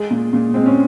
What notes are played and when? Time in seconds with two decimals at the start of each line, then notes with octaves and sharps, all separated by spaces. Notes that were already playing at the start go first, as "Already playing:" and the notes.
Already playing: G#3 G#4
0.11 A#2
0.33 A#2
0.54 G#3 C4
0.66 C#4